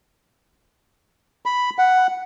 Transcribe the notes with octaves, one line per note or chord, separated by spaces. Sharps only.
B5
F#5